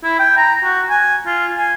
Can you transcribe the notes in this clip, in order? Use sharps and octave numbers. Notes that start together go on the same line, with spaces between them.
E4
G5
A#5
F#4
G#5
F4
G#5